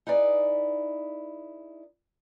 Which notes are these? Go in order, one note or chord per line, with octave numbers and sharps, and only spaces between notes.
D#4 E4 G#4 B4 D5